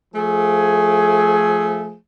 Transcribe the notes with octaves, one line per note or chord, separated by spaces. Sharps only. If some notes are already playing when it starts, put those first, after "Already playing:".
F3 A3 G#4